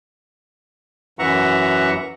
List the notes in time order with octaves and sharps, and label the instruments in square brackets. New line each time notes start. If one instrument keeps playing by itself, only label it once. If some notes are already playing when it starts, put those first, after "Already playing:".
[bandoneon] F#2 E3 E5 F#5 A#5 C#6